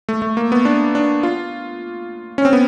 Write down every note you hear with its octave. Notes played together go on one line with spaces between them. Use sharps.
A3
A3
A#3
B3
D4
D4
F4
C#4
C4
B3